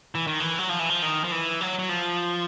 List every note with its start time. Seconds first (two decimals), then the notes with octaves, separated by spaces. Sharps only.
0.15 E3
0.27 D#3
0.40 E3
0.59 F#3
0.69 F3
0.79 E3
0.90 F3
1.02 D#3
1.24 F3
1.32 E3
1.61 F#3
1.79 F#3
1.89 F3